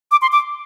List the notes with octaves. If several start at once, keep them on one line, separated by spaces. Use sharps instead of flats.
D6
C6
D6